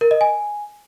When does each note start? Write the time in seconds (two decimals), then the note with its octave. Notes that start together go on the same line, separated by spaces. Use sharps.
0.01 A#4
0.11 D#5
0.21 G#5